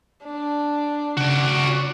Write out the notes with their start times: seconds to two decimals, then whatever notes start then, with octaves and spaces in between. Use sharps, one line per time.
0.23 D4
1.17 C#3 F#4 D5